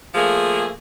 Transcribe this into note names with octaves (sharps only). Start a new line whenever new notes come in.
F3 A3 A#3 G#4